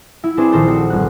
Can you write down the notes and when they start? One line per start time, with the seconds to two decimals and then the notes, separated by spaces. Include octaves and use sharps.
0.24 E4
0.37 C4 D4 G#4 B4 C5
0.52 A#1 D#3 D#4 A4 C5
0.68 C4 F#4
0.90 G1 F#6